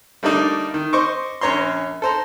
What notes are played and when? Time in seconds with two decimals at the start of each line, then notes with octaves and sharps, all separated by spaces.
0.23 G3 A3 A#3 D4 D#4
0.74 D#3
0.93 C5 D#5 C#6 D6
1.41 A#1 C#4 C#5 A#5 C6
2.02 A4 C5 A#5